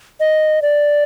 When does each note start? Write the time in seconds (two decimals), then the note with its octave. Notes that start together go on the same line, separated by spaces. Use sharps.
0.20 D#5
0.62 D5